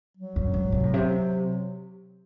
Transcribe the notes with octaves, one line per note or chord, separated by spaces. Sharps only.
F#3
F#2
G#2
C3
A2
C3